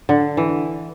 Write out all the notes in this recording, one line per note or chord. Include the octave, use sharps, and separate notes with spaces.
D3
E3